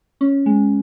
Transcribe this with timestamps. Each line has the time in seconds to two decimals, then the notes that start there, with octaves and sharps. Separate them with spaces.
0.21 C#4
0.46 G#3